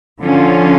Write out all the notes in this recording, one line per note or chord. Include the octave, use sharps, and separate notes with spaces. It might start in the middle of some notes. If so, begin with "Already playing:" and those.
D3 F3 C#4 F4